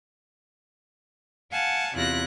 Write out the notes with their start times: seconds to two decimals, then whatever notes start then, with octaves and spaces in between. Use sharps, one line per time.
1.52 F5 F#5 G#5 A5
1.95 E2 C3 E4 F4 F#6 A#6